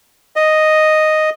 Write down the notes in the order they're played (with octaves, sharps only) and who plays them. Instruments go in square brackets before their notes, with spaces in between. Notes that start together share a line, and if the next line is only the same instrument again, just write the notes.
[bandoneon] D#5